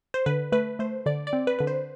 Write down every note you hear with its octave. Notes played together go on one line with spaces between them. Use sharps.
C5
D3 B4
A3 B4
A3 C5
D3 D5
D5
C4
B4
D3 B4
C5